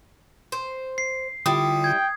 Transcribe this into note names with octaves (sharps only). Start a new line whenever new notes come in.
C5
C7
D3 G3 E4 F4 D#6
G5 G#6